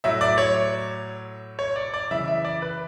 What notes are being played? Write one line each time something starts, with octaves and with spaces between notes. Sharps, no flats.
A2 F#3 E5
D5
C#5
C#5
D5
D5
C#3 E3 E5
E5
D5
B4